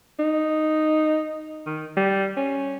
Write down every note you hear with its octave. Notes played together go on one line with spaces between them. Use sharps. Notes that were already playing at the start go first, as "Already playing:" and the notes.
D#4
D#3
G3
C#4